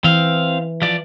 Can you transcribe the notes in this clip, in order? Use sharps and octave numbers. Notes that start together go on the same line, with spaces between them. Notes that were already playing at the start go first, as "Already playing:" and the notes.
E3 C4 F5
F3 D5